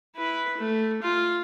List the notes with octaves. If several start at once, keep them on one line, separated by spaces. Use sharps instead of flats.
E4 B4
A3
F4